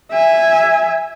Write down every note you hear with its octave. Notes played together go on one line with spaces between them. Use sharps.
E5 G#5